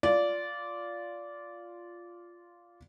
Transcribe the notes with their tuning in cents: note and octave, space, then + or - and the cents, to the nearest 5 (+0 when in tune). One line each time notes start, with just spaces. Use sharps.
F4 +0 D5 -15